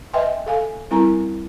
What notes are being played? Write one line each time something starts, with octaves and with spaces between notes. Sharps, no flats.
B4 D#5 E5 G5 G#5 C6
A4 F5 G#5
G3 C4 E4 A#4 G#5 A#5